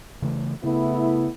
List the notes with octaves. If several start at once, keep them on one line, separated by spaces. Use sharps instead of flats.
C#3 E3 A3
C#3 A3 B3 E4